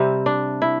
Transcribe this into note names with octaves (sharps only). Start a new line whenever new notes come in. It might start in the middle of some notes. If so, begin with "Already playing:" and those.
Already playing: C3 G3 C4
D4
E4